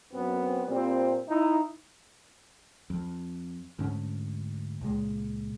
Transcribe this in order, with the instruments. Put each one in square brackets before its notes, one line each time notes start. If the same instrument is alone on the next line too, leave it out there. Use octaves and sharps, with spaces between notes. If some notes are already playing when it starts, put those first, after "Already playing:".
[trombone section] F#2 B3 C4
A#2 G3 C4
D#4 E4
[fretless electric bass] F2
D2 G#2 C#4
C#2 A#2 G#3